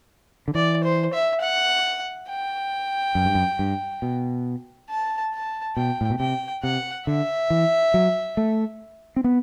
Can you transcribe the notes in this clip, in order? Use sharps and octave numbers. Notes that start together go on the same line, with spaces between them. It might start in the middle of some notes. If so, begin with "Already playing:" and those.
D3
E3 D5
C5
E5
F#5
G5
F#2
G2
F#2
G2
B2
A5
A5
B2 G5
A2
B2
C3 G5
C3 F#5
D3 E5
E3
F#3
A3
C4
B3